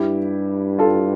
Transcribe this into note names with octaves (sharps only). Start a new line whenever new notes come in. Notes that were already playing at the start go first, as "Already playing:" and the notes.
Already playing: G2 E4 G4
F4 A4